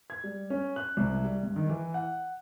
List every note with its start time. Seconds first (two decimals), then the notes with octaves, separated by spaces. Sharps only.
0.10 G#6
0.24 G3
0.50 C#4
0.76 F#6
0.97 C2
1.25 G3
1.43 G2
1.56 D#3
1.69 E3
1.94 F#5